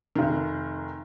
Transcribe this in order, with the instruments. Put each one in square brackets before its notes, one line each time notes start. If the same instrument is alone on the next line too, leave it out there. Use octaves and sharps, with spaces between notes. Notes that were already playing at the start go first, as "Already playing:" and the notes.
[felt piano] F1 D#3